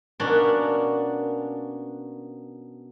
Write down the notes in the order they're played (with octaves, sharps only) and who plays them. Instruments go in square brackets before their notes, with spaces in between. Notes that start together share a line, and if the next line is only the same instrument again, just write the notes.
[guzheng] B2 A#3 C#4 D4 D5